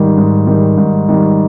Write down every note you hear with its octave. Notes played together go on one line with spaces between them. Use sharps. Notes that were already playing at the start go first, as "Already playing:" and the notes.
Already playing: G#2 D#3 G3
G#2
D#3 G3
G#2
D#3 G3